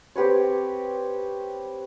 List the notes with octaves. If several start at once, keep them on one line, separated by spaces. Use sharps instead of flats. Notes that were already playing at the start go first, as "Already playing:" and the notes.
C4 G4 B4 C#5